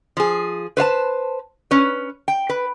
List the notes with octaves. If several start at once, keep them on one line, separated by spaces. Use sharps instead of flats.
F3 G#4
B4 C5 F5 A5
C#4 B4
G5
B4